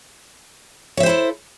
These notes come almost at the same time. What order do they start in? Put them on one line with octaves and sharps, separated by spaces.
C#5 E5 C5 E4 A4